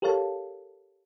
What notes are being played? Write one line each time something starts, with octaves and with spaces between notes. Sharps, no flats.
G4 A4 A#4 C#5 F5 A5